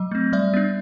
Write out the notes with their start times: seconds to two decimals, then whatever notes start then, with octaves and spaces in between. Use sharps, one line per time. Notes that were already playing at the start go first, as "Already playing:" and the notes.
Already playing: F#3 D#5
0.11 A3 C4
0.32 G3 D5 E5
0.54 B3 D4